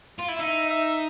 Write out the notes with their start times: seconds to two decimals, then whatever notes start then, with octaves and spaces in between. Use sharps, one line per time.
0.18 F4
0.28 E4
0.39 D#4 E5
0.70 E5